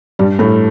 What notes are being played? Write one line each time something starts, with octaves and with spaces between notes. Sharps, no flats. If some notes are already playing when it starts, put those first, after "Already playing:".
G2 G3
A2 A3